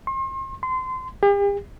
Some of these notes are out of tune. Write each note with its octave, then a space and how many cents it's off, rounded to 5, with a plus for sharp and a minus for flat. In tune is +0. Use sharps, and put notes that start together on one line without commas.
C6 +40
C6 -25
G4 +45